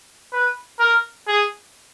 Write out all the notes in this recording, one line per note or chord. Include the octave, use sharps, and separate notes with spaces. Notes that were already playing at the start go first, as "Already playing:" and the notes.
B4
A#4
G#4